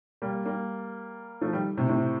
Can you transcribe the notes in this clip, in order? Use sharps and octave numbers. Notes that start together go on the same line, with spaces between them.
G3 A#3
G3 A#3
F3 A3
D#3 G3
A2 C3
A2 C3